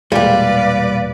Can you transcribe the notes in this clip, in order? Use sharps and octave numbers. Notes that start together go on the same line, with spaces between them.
E1 A#2 G3 G#3 G4 B4 D5 F5